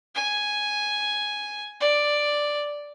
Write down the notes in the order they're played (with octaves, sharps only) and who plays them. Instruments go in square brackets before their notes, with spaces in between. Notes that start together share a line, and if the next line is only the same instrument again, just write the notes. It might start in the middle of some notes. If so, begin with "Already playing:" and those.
[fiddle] G#5
D5